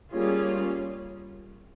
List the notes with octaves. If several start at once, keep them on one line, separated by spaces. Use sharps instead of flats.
G3 A#3 C#4 F4 G#4